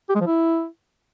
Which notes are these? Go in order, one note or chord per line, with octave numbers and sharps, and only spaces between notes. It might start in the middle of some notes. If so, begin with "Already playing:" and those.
G4
G#3
F3
E4